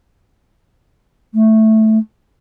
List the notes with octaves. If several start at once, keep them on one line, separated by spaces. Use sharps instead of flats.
A3